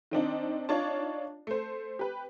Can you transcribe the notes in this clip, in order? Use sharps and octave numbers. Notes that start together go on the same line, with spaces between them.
D#3 C4 D4 D#4
D4 D#4 F4 C#5 D5 A5
A3 C5
G4 B4